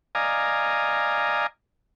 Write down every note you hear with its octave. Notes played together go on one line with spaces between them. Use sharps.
D5 D#5 F5 G#5 A#5